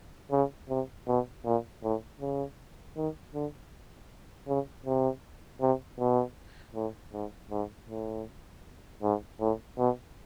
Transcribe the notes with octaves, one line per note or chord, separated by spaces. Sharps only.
C#3
C3
B2
A#2
A2
C#3
D#3
D3
C#3
C3
C3
B2
A2
G#2
G#2
A2
G#2
A2
B2